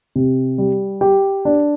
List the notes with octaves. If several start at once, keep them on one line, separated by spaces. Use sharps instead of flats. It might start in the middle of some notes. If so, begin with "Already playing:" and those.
C3
G3
G4
D4